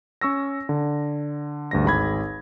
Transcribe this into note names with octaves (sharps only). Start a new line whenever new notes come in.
C#4 C#6 E6 A#6
D3
D2 G2 A#6
G#1 G#4 B5 G#6